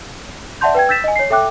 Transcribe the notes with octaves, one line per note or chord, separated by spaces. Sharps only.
D5 E5 F#5 A5 C6 G6
B4 G5 G#6
E6 G6 A6 B6 E7
D#5 G#5
C#5 C7
A4 E5 G5 D6 F#6